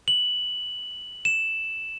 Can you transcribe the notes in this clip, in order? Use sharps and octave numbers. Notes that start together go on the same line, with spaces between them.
F#7
E7